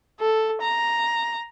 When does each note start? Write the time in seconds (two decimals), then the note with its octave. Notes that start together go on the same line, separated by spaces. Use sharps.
0.20 A4
0.62 A#5